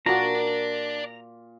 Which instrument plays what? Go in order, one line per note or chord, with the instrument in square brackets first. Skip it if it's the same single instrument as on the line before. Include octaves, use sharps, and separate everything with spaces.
[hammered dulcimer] A#2 [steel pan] F4 F#4 [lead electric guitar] D5 A5 [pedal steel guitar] A#5